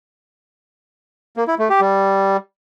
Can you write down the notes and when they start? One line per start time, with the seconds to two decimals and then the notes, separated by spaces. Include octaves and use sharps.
1.37 A#3
1.48 E4
1.59 A3
1.70 G4
1.81 G3